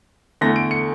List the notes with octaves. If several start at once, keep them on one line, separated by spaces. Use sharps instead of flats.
E2 D3 A3 A#6
D7
C#7